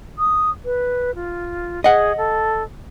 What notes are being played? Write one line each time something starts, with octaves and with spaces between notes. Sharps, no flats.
D#6
B4
F4
G#4 D#5 F#5
A4